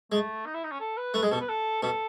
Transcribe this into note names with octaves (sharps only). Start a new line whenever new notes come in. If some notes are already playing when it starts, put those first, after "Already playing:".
G#3 A3
D#4
E4
D#4
C#4
A4
B4
A3 B4
G#3 G#4
B2 A4
B4
A4
B2 A4